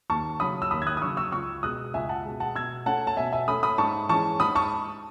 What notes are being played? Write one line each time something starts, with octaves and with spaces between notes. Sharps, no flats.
D#2 A5 C#6
C#3 F#3 C#4 B5 D#6
E6
D#2 B5 D#6
G#6
D#6 F#6
D#6
C#3 F#3 C#4 C#6 E6
C#6 E6
C#2 C#6 E6
B2 G#3 D#6 F#6
C#2 E5 G#5
F#5 A5
B2 G#3
F#5 A5
B2 E6 G#6
A3 C#4 F#5 A5
A5
B2 E5 G#5
E5 G#5
A3 C#4 B5 D#6
B5 D#6
G#2 A5 C#6
E3 G#3 C#4 A5 C#6
G#2 B5 D#6
A5 C#6